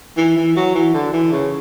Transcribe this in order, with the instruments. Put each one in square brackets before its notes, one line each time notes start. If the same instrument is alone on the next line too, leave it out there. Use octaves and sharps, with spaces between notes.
[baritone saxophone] E3
E3
F#3
E3
D3
E3
C#3